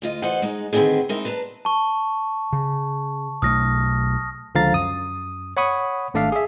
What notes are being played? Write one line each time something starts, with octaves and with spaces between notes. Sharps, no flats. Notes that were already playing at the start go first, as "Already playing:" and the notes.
D2 F4 D#5
B2 E3 A4 C5 D#5 F#5
G#3 D#4
D3 D#3 B3 C4 D4 G#4
G#3 C4 D#4 E4 A#4 D#5
D4 B4 A5 A#5
A5 C#6
C#3
B1 A3 D#6 F6 A#6
C#2 D3 F3 F5 A#5 A6
F#2 D#6
C#5 F#5 B5 C#6 D#6
G#1 A3 D4 D5 E5 F5
G#4 E5